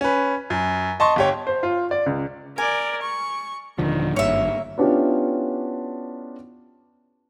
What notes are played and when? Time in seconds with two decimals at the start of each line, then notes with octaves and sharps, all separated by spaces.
0.01 C#4 B4
0.50 F#2
1.00 D#5 A5 C6 C#6
1.16 G1 G4 C#5
1.47 C5
1.63 F4
1.91 D5
2.06 C#2
2.58 A#4 D5 G#5
3.02 C#6
3.79 D#1 D3 D#3 F3
4.16 G#1 G2 A#3 C#5 E5
4.78 B3 C#4 D4 E4 F4 G4